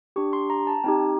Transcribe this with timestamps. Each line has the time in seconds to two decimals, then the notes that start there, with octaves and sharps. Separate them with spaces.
0.16 D4 G4 C#6
0.33 C6
0.50 A#5
0.67 A5
0.84 C4 D#4 G4 G5